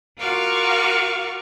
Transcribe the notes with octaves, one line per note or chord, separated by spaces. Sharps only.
F4 F#4 A#4 F5 C#6 D6